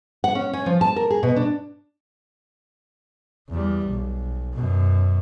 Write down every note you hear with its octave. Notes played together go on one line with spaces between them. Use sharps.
F#5
C#4
C#4
F3
A5
A#4
G#4
B2
D4
E2 G3
B1
F#2 B2